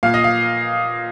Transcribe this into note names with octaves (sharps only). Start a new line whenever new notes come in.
A#2 F5
D#5
F5